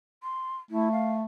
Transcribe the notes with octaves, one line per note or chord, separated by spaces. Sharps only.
C6
A3 E4
F5